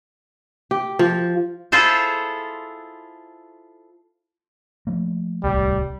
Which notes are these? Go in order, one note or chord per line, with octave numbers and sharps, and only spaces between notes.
G4
F3
E4 F4 G#4 A4 C5
F3 A3 A#3
D1 C2 A2 G3